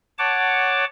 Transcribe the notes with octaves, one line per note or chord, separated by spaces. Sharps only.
C#5 F#5 A5 D6